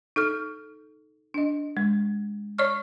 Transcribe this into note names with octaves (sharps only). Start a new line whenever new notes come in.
D#4 A4 F6
D4 D#5
G#3
C#5 D5 C#6 F6